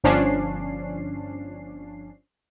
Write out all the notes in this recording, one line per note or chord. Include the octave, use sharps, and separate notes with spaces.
G1 F3 C#4 D4 C7